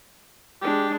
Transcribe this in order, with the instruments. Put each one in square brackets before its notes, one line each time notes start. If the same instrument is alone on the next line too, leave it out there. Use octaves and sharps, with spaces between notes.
[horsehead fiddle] G#3 D4 [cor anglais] G4